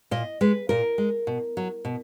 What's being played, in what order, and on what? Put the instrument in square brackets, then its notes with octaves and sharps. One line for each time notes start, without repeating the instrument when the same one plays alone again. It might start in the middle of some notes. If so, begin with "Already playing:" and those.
[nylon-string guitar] A#2 D#5
G#3 B4
A#2 A#4
G#3
B2
F#3
B2